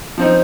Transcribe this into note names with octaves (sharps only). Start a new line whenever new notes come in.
F3 C4 D#4